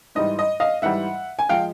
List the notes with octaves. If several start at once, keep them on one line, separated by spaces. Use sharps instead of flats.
G#2 E3 G3 D#5
D#5
D#5 F5
G#2 E3 G3 E5 F#5
G#5
F3 G#3 F5 G5